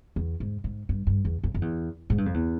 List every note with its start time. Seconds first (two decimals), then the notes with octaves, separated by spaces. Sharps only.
0.16 E2
0.40 G#2
0.64 G#2
0.89 G2
1.07 G2
1.25 E2
1.43 F2
1.54 F2
1.62 E2
2.10 G#2
2.18 G2
2.26 F2
2.34 E2